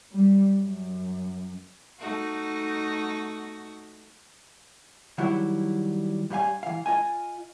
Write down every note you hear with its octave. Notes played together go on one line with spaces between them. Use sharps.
G3
F#2
A3 D#4 F#4
D#3 F#3 G3 E4 F#4
G2 G3 F5 G#5
E3 F5
F4 D#5 G#5